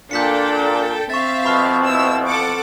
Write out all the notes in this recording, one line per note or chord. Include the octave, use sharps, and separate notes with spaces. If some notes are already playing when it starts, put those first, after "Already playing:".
A#2 D4 A4 G5 G6 B6 C#7
C4 E5 F5 C#6 A6
F2 B2 B5 C#6 F6
E4 E6
A4 F#5 D6